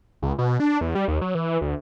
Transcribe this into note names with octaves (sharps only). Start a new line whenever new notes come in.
C#2
B2
D4
E2
G3
D#2
F#3
E3
D2